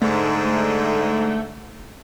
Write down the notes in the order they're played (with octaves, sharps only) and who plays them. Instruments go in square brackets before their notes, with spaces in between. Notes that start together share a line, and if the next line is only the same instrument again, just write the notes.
[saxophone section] G#2 D3 [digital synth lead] A3